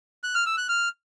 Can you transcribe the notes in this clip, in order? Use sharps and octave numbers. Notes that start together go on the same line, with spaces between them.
F#6
F6
E6
F#6
F6